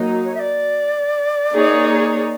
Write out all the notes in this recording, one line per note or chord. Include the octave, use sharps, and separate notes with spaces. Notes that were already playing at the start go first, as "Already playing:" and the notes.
Already playing: F#3 A#3 D#4
C#5
E5
D5
A#3 D#4 G#4 C#5